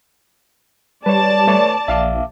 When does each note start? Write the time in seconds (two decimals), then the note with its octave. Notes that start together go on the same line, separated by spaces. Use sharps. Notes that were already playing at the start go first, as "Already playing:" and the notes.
1.06 G3 B4 C#5 D5 A5
1.47 A3 B4 C#5
1.88 A#1 E5 F5 D6